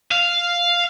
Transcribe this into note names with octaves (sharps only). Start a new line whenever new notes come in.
F5